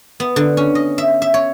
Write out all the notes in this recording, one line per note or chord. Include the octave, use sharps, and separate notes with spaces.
B3
D3
C#4
D#5
E5
E5
C#5